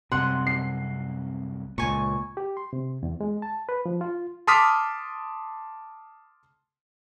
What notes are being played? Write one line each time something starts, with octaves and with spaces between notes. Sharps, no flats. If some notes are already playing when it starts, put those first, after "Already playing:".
C2 F#2 C3 F#5 C6
C7
C#2 A#2 G#5 C#6
G4
C6
C3
E2
G#3
A5
B4
F3
F4
A5 C6 D6 D#6 F6 B6